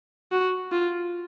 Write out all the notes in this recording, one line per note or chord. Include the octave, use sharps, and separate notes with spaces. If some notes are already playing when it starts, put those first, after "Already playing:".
F#4
F4